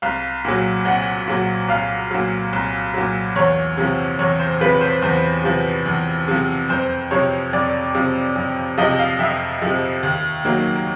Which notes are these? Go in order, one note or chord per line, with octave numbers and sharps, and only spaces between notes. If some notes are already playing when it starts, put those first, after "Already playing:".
C2 F5
A#2 F#3
C2 F#5
A#2 F#3
C2 F5
A#2 F#3
C2
A#2 F#3
E2 C#5
C3 F3
E2 C#5
C5
C3 F3 B4
C5
E2 C5
C3 F3
E2
C3 F3
F2 C5
C3 F3 C#5
F2 D5
C3 F3
F2
C3 F3 D#5
F5
F2 E5
C3 F3
D#2
D#3 F#3 A#3